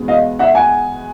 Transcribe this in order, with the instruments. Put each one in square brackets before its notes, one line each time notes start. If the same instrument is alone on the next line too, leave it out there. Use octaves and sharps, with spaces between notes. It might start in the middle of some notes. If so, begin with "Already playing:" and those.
Already playing: [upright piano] E2 B2 G#3 B3
D#5 F5
E5 F#5
F#5 G#5